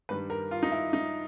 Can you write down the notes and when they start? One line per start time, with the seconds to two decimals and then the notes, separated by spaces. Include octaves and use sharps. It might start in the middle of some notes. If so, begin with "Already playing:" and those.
0.09 G2 D#3 G3 B4
0.30 A#4
0.51 F4
0.63 D#4
0.72 E4
0.93 D#4